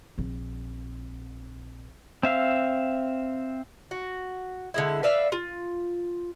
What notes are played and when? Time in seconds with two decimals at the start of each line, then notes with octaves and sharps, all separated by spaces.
0.18 A#1 C4
2.23 C4 E5 F5
3.91 F#4
4.74 D3 G#3 E4
5.03 B4 D5 E5 F5
5.32 F4